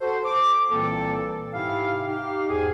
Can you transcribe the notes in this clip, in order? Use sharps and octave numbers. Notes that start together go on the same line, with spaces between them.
F#4 A4 C5
D6
C2 A#2 E3 A#3 C4 A4
G#2 C3 E4 G4 F5
D#4 G4 F5
E2 G#2 G#4